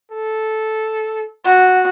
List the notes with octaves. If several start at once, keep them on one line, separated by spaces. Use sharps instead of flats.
A4
F#4